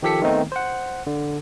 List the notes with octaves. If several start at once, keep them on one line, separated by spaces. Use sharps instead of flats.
D#3 F3 G4 A4 B6 C#7
D#3 A3 B3 C4 D#4
C5 F#5
D3